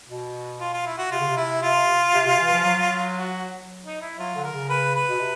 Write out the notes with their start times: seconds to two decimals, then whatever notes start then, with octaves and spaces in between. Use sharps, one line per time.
0.09 B2
0.61 F4
0.73 F4
0.86 E4
0.98 F#4
1.11 C3 F4
1.19 C#3
1.28 C3
1.37 E4
1.62 F4
2.13 C3
2.26 C3
2.39 E3
2.52 F3
2.65 F#3
3.16 F#4
3.84 D#4
4.01 E4
4.18 F#3 F4
4.35 D3
4.43 A#4
4.53 C#3
4.69 B4
4.94 B4
5.09 B2
5.20 C3